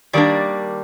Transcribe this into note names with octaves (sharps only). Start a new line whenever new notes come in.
D#3 G3 A#3 D4 D5